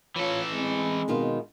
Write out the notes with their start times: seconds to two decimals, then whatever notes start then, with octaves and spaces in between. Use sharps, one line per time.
0.16 E3 F4 A4 C#5
0.52 G#3 C4
1.08 B2 D#3 F4